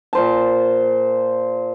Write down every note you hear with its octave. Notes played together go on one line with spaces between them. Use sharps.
A#2 C5 A5